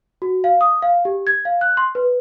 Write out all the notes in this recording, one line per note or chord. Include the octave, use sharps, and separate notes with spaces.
F#4
F5
D#6
F5
G4
G#6
F5
F#6
C6
B4